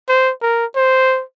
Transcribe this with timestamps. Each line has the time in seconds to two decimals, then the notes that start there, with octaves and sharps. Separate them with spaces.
0.09 C5
0.42 A#4
0.76 C5